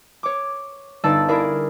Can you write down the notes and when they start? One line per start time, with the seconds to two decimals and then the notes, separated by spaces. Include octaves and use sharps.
0.23 C#5 D6
1.04 G1 D#4 D5 A5 E6 A6
1.28 E4 G#4 A#4 D5